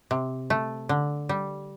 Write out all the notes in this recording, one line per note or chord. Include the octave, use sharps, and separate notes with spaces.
C3
A3
D3
G3